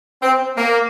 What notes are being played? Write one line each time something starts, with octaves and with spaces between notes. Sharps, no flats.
C4
A#3